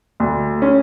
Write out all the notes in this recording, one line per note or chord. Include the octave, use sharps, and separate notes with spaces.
D2
C#4